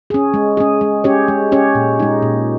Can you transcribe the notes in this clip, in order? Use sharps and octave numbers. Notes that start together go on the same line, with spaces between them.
C#4 G#4
G#3
C#4 G#4
G#3
C#4 G4 C#5
G#3
C#4 G4 C#5
A#2
G#3 D#4
A#2